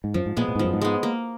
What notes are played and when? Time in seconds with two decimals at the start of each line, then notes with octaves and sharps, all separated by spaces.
0.04 G#2
0.14 F#2 F3
0.26 G#2
0.37 A#2 G#3 B3
0.48 A#2
0.56 G#2
0.59 F3
0.64 F#2
0.73 G#2
0.81 G#3 B3
1.03 A#3